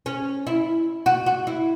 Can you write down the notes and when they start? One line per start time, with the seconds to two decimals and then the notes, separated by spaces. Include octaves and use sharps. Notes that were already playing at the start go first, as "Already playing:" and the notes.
0.06 C#4
0.47 E4
1.06 F#4
1.26 F#4
1.47 E4